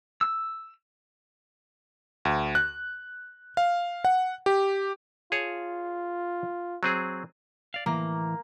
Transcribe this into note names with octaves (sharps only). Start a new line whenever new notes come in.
E6
D2
F#6
F5
F#5
G4
F4 G#4 C#5 A5
F#3 C4 G#4
D5 F5
A2 E3 A#3